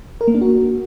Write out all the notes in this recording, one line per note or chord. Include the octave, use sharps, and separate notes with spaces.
A#4
A#3
D4
F#4